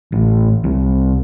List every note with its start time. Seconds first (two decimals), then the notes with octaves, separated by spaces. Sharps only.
0.12 A1
0.64 C2